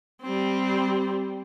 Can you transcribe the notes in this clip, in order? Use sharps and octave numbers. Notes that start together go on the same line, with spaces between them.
G3 C4